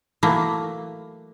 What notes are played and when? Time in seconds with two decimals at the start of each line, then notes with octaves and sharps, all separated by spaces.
0.23 E3 F#3 A3 A#3